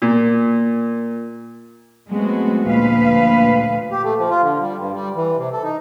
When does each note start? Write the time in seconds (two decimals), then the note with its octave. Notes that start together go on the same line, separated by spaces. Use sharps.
0.02 A#2
2.09 F#3 G#3 A3 B3 C4 F#4
2.67 D2 A#2 F3 B4 F5
3.91 G4
4.03 A3
4.18 F3
4.30 F4
4.42 D3
4.61 G3
4.77 G2
4.93 G3
5.16 E3
5.37 C3
5.52 A4
5.64 D#4